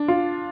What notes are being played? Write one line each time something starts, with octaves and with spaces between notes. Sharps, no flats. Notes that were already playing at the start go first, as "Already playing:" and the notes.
Already playing: D4
F4